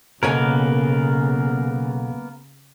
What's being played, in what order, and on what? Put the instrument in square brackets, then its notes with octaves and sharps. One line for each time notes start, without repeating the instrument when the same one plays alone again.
[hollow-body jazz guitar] B1 C#5 G#5 [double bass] C#3 [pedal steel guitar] A#3 B3 A#4